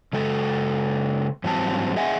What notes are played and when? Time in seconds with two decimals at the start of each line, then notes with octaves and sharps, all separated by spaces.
0.13 C#3 G#3 A4
1.44 G#2 E3 F#3 G3 C4 A5
1.96 G#4 D#5 E5 F#5 G#5